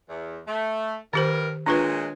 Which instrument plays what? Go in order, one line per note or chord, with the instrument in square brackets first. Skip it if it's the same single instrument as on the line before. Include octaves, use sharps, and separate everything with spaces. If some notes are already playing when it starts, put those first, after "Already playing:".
[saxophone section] E2
A3
[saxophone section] G2 A#4 [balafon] D#3 G4 C5
[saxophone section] A#2 F#3 G#3 [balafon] D4 F4 B4